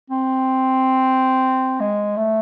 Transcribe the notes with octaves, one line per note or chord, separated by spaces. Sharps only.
C4
G#3
A3